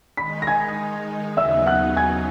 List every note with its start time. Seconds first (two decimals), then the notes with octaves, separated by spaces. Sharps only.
0.17 D#3 G#3 D#4 B5 B6
0.42 A#6
0.47 G#5 G#6
1.37 D#2 C#3 F#3 B3 D#4 E5 E6
1.66 F#5 F#6
1.96 G#5 G#6